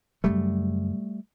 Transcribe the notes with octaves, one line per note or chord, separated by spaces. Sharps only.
F#2 C#3 G3 A3